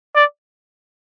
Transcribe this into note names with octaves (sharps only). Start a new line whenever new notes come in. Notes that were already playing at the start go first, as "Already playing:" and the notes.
D5